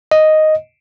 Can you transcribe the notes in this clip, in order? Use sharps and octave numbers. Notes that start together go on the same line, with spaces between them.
D#5